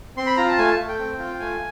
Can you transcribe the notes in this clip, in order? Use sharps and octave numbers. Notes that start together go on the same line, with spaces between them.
C4 C6
B5
F4 A#5
A5
A3 G#5
A5
A3
G5
C4
F4
A3 G#5